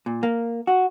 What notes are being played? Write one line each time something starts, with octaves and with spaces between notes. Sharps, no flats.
A#2
A#3
F#4